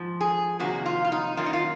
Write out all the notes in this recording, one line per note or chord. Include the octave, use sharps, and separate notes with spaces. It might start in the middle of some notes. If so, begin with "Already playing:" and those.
Already playing: G#2 F3
G#4
F2 C3 D#3 F#3 A#3 F#4
F4
F4
D#4
F#2 D#3 F#3 A#3 F4
D#4
F4